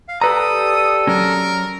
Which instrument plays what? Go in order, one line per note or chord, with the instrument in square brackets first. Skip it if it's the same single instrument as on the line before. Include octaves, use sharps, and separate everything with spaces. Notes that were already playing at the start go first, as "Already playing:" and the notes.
[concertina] F5
[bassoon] G3 [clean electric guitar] G4 B4 A#5 [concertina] A4 [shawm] D#6
[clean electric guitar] F#3 C#4 [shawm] A#4